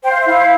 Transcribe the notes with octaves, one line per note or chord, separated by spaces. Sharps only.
C5 G5
F5
E5
E4 F5